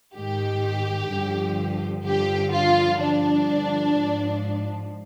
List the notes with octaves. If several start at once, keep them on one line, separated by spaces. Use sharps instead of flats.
G#2 D#3 G4
G2 D3 F3
G2 D3 F3 G4
F4
G2 D3 F3 D4
G#2 F3